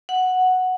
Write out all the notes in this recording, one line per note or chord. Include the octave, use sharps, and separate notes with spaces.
F#5